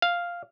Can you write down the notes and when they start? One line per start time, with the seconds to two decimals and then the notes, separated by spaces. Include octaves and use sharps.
0.02 F5